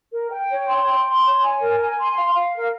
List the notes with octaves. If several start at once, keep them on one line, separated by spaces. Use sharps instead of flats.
A#4
G5
C#5
C6
G5
C6
C#5
G#5
A#4
G#5
C6
F5
F5
A#4